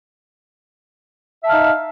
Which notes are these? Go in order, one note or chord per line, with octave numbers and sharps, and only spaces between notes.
D#4 E5 F5 A5